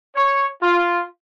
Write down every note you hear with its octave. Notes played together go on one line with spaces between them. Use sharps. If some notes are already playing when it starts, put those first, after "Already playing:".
C#5
F4